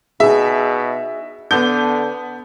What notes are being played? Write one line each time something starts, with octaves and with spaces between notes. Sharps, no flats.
B2 D#4 G#4 E5
D3 B3 A5 G6